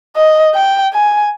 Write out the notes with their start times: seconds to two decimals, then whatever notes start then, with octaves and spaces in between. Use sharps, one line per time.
0.16 D#5
0.55 G5
0.94 G#5